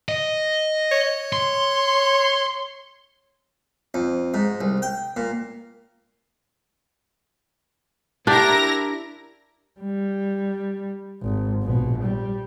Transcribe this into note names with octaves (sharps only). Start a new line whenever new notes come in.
D#5
C#5
C6
F2
G#2
C2
G5
A#2
D4 E4 G4 A#4 A#6
G3
G#1
A#1 B2
G3